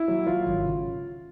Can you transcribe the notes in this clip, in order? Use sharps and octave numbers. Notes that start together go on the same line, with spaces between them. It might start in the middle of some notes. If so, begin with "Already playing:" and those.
Already playing: E4
F#3
F#3 F4
G#1
C#3